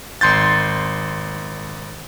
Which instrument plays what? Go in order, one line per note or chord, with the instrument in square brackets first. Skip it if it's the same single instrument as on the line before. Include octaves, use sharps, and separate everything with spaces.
[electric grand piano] G#1 C6 G6 A6